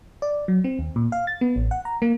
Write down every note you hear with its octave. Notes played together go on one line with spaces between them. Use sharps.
D5
F#3
C4
D#2
A#2
F5
A6
B3
A1
F#5
A#5
A#3